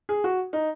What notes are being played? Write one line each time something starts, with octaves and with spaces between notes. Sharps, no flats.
G#4
F#4
D#4